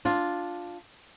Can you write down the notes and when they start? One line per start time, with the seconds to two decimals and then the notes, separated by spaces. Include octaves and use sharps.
0.05 D4 F4